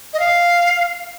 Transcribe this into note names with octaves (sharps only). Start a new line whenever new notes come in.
D#5
F5